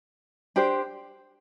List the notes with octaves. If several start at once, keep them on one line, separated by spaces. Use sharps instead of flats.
D4 G4 C5